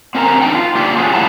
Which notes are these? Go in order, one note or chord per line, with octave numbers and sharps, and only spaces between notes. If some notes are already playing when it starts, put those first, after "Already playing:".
C4 C#4 A#4 G#5 A#5
D4 D#4 G5
F4
A#3 D4 F4 G4
C#4 D4 F4 F#4 G#4
F2 E3 G3 E4 A5 A#5